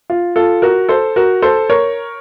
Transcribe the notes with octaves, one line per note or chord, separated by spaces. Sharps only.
F4
F4 A4
F#4 A#4
A4 C5
F#4 A#4
A4 C5
A#4 C#5